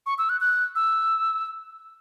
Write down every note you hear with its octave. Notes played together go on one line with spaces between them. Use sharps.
C#6
E6
F#6
F#6
E6